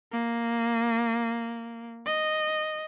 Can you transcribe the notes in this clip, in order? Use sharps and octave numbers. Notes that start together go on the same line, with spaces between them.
A#3
D#5